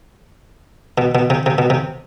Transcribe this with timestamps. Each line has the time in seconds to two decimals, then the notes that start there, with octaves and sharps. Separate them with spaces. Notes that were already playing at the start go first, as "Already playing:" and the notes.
0.98 B2
1.15 B2
1.30 C3
1.46 C3
1.58 B2
1.70 C3